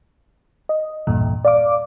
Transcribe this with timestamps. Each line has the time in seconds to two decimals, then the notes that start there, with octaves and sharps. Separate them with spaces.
0.69 D#5
1.07 A1 E2 G2 A#2
1.45 D5 F5 D6